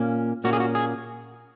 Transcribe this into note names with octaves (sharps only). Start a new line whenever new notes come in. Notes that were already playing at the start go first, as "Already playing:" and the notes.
Already playing: A#2 A#3 C#4
A#2 A#3 C#4 F#4
G#4
F#4
G#4